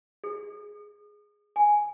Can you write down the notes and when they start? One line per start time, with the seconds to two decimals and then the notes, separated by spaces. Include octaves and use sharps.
0.24 G#4
1.56 G#5